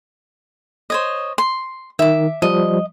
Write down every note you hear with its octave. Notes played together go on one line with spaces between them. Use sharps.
C5 C#5 D#5
C6
D#3 E5 D6
F3 G3 D#5